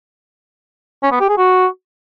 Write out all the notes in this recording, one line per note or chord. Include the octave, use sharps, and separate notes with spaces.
C#4
B3
G4
G#4
F#4